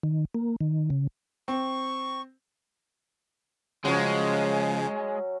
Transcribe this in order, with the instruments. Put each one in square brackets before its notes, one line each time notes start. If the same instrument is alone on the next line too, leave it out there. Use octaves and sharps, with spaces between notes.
[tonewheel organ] D#3
A#3
D#3
C#3
[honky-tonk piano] C4 [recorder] C#6
[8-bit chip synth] C#3 F3 [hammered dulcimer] F#3 C#4 [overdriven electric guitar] G#3